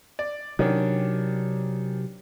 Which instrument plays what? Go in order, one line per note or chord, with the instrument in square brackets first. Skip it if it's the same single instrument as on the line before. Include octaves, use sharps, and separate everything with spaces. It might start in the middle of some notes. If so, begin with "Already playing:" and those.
[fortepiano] D5
[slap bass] C3 F#3 [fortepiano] D#3 C#4 D4